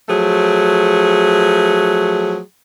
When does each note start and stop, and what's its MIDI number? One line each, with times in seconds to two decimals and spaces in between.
0.08 2.38 53
0.08 2.38 54
0.08 2.38 57
0.08 2.38 68